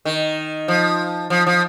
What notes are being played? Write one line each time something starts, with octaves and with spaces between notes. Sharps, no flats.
D#3
F3
F3
F3